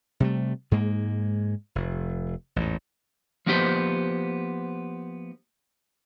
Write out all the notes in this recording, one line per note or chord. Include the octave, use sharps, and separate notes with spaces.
C3 G3 A3
G#2 G#3 A#3
F1
A1 E2 G#2
F3 A#3 B3 D#4 G4 C5